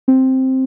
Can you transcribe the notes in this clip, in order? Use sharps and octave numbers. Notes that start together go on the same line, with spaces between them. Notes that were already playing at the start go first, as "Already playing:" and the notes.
C4